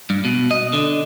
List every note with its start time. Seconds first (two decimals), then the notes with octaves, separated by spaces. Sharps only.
0.10 G2
0.25 B2
0.51 D#5
0.73 D3